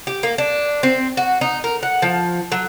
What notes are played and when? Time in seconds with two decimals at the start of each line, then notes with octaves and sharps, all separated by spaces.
0.07 G4
0.23 A#3
0.38 D4
0.83 C4
1.17 F#4
1.41 D#4
1.64 A#4
1.83 F#5
2.02 F3
2.52 F#3